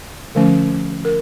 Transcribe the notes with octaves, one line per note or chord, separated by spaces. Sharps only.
D3 F3 A3 C#4
A#4